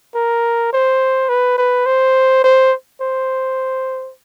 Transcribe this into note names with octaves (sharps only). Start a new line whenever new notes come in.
A#4
C5
B4
B4
C5
C5
C5